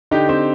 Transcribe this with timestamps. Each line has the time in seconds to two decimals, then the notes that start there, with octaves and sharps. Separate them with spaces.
0.11 D3 D#4 G4
0.29 C4